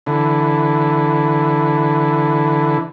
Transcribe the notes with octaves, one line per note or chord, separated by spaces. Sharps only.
D3 E3